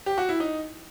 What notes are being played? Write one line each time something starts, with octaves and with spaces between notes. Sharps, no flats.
G4
F#4
E4
D#4